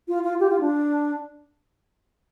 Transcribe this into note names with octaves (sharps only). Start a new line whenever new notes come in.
F4
F4
G4
F4
D4